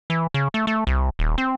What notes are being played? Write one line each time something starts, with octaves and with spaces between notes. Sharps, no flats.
E3
C#3
A3
A3
C2
D#1
C4